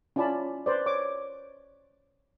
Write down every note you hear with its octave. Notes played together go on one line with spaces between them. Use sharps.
C#4 E4 F4 D5 A5 B5
B4 C5 D5
C#5 D6